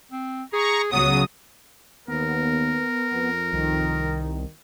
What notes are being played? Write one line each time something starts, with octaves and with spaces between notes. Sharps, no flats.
C4
G#4 A#5 C#6
C#2 C#3 F#3 B3 D#6
D#2 B3 A#4
F2
C2 D#3